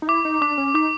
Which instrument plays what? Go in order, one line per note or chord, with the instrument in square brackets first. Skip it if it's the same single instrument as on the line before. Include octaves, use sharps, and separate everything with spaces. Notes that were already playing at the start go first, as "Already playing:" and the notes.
[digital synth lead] D#4
[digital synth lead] E4 [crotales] D6
[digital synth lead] D#4
[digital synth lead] D4 [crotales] D6
[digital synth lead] C#4
[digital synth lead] D#4 [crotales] D6